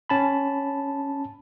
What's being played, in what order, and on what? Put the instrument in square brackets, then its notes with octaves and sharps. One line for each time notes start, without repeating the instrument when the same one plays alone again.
[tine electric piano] C#4 A5 B5